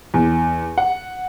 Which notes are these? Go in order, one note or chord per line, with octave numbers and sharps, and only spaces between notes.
E2
F#5